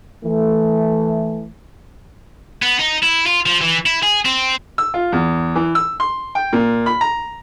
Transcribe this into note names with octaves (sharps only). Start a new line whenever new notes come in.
E3 A3
B3
D#4
E4
F4
F3
E3
E4
G#4
C4
E6
F4
E2
E3
E6
C6
G5
A#2
B5
A#5